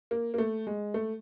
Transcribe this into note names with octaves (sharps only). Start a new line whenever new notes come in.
A#3
A#3
A3
G#3
A3